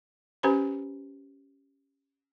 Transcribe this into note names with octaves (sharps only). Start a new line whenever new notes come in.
C#4 G4 B4 C5 A#5 B5